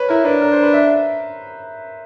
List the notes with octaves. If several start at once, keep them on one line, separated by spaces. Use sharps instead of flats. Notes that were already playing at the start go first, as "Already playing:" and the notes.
Already playing: B4 C#5
E4 A#4
D4 B4
A#4
C5
B4
E5